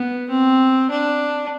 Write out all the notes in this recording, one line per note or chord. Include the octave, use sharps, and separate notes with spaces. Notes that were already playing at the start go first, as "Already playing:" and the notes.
Already playing: B3
C4
D4